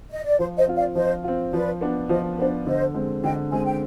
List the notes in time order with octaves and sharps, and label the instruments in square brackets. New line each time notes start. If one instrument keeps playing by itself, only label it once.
[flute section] D#5
D5
[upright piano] F3 [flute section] C5
[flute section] C5 D#5
[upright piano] C4 F4
[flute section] D5 F5
[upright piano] F3 [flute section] C5 D#5
[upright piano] C4 F4
[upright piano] F3 [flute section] B4 D5
[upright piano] B3 D4
[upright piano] F3 [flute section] C5 D#5
[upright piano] B3 D4 [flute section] C5
[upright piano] D3 [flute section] C5 D#5
[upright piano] G#3 C4
[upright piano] D3 [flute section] D#5 G5
[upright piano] G#3 C4 [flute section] G#5
[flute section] G5